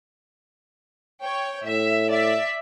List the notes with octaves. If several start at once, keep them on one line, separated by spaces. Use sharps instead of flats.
C#5 G5
A2 E5
D5 E5 B6